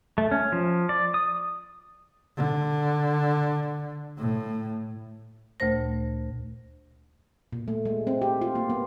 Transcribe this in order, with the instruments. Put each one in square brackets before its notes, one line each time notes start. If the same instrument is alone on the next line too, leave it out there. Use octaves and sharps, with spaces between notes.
[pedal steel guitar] A3
C#4
F3
D5
D#6
[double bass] D3
A2
[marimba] D2 A#2 A3 C5 A#6
[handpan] A#2
A3
G#3
C4
G4
F4
A#3
B3